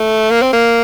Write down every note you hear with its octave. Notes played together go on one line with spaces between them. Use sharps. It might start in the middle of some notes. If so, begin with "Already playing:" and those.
Already playing: A3
A#3
C4
A#3